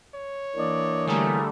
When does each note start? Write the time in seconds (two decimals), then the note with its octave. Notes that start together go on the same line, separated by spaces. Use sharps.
0.15 C#5
0.56 E3 A#3 D4 D5 D#5
1.07 D3 G3 A3 G#4 A#4